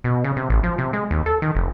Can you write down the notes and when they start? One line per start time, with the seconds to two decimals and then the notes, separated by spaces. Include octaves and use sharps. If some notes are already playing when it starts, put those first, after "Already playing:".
0.04 B2
0.24 C#3
0.37 C3
0.50 A1
0.63 F3
0.78 C3
0.93 G#3
1.11 D#2
1.26 A4
1.42 D#3
1.55 F1